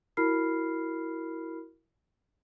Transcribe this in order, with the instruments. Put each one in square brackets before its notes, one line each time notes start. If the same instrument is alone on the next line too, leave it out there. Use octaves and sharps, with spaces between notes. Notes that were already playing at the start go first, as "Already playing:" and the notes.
[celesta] E4 F#4 A#4 B5 F6 C7